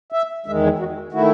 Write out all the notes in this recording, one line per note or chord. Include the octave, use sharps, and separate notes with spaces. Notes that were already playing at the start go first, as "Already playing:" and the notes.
E5
E2 D#3 G#3 E5
G#4
F#4
D#3 A3 E4 F#4